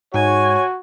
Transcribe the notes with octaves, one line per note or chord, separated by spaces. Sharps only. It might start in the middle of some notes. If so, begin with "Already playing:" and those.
G#2 F#4 C#5 G#5